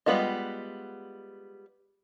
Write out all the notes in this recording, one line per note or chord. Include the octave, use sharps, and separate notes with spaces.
G3 G#3 B3 F4 D#5